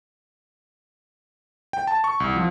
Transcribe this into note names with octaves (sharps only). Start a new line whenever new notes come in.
G5
A5
C#6
C2
F3